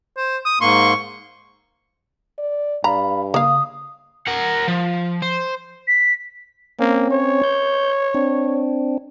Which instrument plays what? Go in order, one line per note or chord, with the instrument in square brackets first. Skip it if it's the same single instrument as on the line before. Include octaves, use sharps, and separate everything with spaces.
[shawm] C5
D#6
[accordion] G#2 A#3 C6 [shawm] C#6
[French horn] D5
[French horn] G2 [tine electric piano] D5 F5 B5 [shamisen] A#5
[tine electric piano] C#3 [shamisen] A#3 F5 [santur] D#6
[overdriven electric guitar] A#4 F#5
F3
C5
[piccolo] B6
[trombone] A#3 [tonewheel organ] C4 C#4
[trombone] C#5
[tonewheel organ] G6
C4 D4